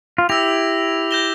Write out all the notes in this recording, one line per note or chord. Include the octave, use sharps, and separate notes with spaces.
F4
E4 G4 E6 A#6 F7
G6 A#6 E7 G7